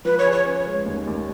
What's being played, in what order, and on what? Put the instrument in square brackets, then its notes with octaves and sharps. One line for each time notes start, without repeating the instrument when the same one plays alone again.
[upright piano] F3 [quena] B4
[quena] C#5
[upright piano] G#4
[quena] C#5
[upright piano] C#4
G#3
D#2
D#2